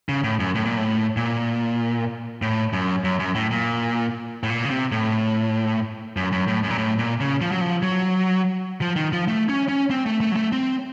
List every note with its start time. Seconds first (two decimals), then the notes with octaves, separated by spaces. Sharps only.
0.09 C#3
0.24 A2
0.40 F#2
0.55 A2
0.65 A#2
0.77 A2
1.17 A#2
2.42 A2
2.73 F#2
3.04 F#2
3.20 F#2
3.35 A2
3.51 A#2
4.43 A2
4.50 A#2
4.65 C#3
4.70 C3
4.92 A2
6.17 F#2
6.32 F#2
6.48 A2
6.63 F#2
6.71 A#2
6.78 A2
6.99 A#2
7.20 C#3
7.41 F3
7.52 F#3
7.61 F3
7.82 F#3
8.81 F3
8.96 D#3
9.13 F3
9.28 A3
9.49 C#4
9.69 C#4
9.91 C4
10.06 A3
10.21 A3
10.32 F#3
10.36 A3
10.52 C4